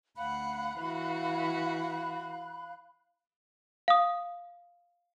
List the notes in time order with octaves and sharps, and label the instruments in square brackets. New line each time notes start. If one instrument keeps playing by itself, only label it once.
[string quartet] D2 F#5 [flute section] F5 B5 F#6
[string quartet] E3 F#4
[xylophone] F5 D#6